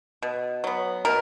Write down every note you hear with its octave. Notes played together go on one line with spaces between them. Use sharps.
B2
F#3 B3
B2 A#4